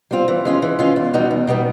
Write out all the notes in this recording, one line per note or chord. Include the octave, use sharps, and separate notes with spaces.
G3 C4 F4
E3
G#3 C#4 F4
E3
G#3 C#4 F4
E2
B2 G3 B3 D#4
E2
B2 G3 B3 D#4